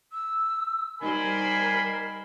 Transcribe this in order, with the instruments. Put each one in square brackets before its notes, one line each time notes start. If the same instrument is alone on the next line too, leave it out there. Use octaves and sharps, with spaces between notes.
[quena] E6
[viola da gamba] G3 D#4 C5 [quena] A#4 [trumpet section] G#5 B5